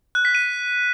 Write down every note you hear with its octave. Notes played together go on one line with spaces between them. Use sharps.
F#6
B6
D#7